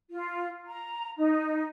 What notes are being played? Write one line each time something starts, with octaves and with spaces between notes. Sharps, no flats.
F4
A#5
D#4